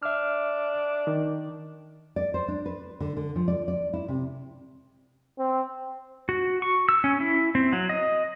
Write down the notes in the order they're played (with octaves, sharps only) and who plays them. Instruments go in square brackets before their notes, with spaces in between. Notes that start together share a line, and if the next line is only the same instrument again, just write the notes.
[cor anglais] D4 [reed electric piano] E5 F6
[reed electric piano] D#3
[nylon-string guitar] D5
C5
D4
B4
D3
D3
F3
D5
D5
E4
C3
[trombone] C4
[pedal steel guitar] F#4
C#6
E6
C#4
E4
C4
F#3
D#5